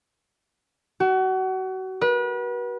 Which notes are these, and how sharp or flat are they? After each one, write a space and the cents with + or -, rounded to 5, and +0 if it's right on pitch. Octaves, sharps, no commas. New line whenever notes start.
F#4 +30
B4 -35